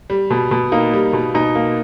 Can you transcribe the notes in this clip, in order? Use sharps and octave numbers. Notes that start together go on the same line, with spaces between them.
G3
B2
B2
A#3 D#4
G3
B2
B2 D#4
A#3